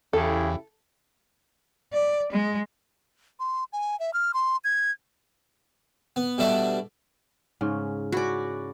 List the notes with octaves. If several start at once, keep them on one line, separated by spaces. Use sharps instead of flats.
E2 C#3 E4 G4 A4
D5
G#3
C6
G#5
E5
F6
C6
G#6
B3
B2 G3 A3 D4 E5
G#2 C#3 C#4
C#4 E4 F#4 D5